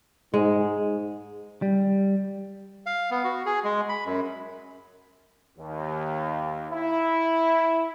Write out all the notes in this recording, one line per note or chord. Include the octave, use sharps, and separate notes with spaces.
G#2 G#3
G3
F5
B3
F#4
G#4
G#3
B5
F#2
D#2
E4